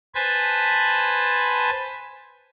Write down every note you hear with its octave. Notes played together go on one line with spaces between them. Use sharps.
B4 C5 G#5 A5 B5